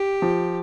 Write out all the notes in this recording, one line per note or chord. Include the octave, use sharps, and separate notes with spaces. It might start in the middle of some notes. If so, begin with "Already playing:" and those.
Already playing: G4
F3